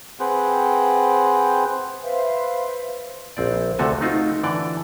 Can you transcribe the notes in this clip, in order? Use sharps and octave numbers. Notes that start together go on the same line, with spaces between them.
C4 G#4 B4 C5 F#5 G5
B4 C5 E5 F5
A#1 C4 D5
D2 C3 A3 F#4 A4 G#5
A3 C4 D#4 F4 F#4
D3 E3 D5 G5